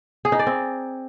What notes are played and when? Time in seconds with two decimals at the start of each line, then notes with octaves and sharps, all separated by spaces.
0.25 G#4
0.32 D#4
0.39 D5
0.47 C4